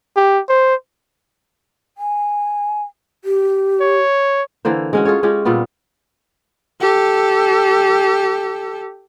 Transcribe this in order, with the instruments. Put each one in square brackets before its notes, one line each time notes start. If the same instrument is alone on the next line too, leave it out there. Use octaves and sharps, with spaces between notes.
[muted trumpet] G4
C5
[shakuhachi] G#5
G4
[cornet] C#5
[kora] D3 E3 A#3 C5
G#3 C#4 F#4
F4 G#4 A4 C#5
G#3 C#4 F4 G4
A#2 G3 B3 F4
[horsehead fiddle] G4 A4